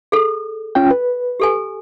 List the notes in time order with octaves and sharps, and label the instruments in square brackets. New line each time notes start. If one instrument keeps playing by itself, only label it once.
[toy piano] G#4 A4
[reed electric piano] C#4 F4 G5
B4
[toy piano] G4 A4 G#5